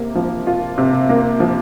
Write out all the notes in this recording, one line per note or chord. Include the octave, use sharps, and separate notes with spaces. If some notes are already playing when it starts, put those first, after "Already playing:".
Already playing: C3 A#3
F3
F4
C3
A#3
F3